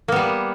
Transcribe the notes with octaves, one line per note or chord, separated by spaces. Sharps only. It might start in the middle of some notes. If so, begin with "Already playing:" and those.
G3 A#3 B3